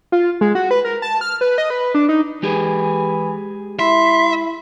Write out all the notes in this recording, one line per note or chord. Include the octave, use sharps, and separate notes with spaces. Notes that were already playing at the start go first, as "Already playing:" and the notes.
F4
G#3
F#4
B4
A#4
A5
F6
B4
D#5
B4
D4
D#4
E3 G#3 G4 G#4
E4 E5 C6